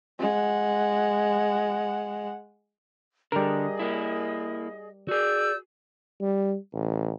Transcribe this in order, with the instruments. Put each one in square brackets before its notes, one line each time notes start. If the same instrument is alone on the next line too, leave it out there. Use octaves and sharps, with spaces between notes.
[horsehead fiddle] G#3 F#5
[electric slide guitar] D3 [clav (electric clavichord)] G3 A#4 [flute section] G#4 D#5
[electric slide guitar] A#3 E4
[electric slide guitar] F#4 G#4 [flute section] D5 E6 G6
[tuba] G3
A1